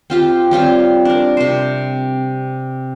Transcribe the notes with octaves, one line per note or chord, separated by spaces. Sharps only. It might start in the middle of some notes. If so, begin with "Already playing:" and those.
C4 F4 G4
G3 C4 F4 C#5
D4 A#4
C3 C5